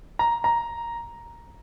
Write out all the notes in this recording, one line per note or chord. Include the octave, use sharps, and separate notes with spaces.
A#5
A#5